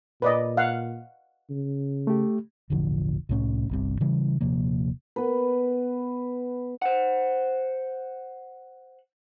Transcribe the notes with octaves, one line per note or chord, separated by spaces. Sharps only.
A#2 B4 D5 D#5
F5 F#5
C#3
A3 G4
E1 A1 D3 F3
C2 A2 C#4
G1 C2 C3
C#3 E3 G3
D#1 C3 F3 A#3
B3 B4
C5 F#5